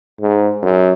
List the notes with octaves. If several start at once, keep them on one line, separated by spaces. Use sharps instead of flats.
G#2
F#2